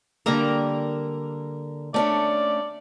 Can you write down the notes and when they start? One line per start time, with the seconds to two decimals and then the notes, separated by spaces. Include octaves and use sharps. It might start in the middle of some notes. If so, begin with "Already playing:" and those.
0.26 D3 G3 A#3 A#4 A#5
1.94 A3 C#4 D4 D5